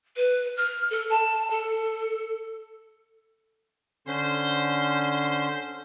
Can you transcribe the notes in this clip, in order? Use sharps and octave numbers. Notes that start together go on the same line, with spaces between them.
B4
F6
A4
A5
A4
D3 C#4 C5